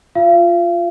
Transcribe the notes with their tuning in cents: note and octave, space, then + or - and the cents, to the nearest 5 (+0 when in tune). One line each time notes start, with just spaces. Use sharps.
F4 +0 F5 -40